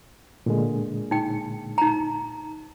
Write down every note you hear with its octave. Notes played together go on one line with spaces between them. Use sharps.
A#2 D3 G#3
D#4 G5
D#4 A#5